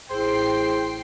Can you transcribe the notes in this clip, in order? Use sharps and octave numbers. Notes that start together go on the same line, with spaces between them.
A1 E4 G#4 C5 G5 C7